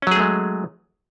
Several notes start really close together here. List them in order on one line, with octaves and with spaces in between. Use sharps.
C#4 F#3 G#4 A3 G#3